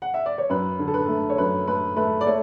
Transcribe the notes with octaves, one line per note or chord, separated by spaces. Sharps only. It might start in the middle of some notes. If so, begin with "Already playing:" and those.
F#5
E5
D5
C#5
F#2 B4
D3
A4
B4
A3
C#5
F#2 B4
A3 B4
A3 B4
D5
A3 C#5